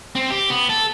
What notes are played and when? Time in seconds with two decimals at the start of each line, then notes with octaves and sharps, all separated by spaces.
0.15 C4
0.30 G4
0.50 B3
0.69 A4